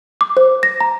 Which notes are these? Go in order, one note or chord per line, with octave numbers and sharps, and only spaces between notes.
D6
C5
A#6
A#5